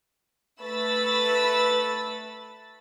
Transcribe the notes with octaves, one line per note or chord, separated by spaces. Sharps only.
A3 B4 B5 E6 A6